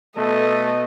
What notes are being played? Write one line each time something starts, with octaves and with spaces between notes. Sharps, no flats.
B2 A3 B3 A4 D#5